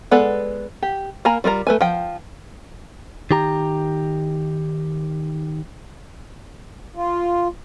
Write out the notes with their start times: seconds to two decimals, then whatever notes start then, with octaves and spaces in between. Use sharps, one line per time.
0.11 G#3 B3 A4 B4 D5
0.83 G4
1.25 A#3 A#4 G#5 A#5 B5
1.44 G3 F4 A#4 A#5
1.67 A3 B4 G#5
1.81 F3 G5
3.31 D#3 G4 A#5
6.95 F4